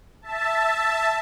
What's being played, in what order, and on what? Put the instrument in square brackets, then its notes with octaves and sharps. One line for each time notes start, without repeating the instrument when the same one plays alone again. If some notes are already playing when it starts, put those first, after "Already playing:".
[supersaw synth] E5 A5